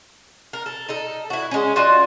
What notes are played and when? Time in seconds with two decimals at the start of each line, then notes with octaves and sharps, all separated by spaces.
0.53 A#4
0.66 A4
0.89 D#4 A4
1.30 E4 F#4
1.51 G#3 C#4
1.76 F4 F#4 D5 D#5